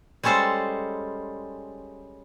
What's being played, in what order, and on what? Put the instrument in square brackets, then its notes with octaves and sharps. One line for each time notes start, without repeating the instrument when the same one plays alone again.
[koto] G3 G#3 C#4 A4 C5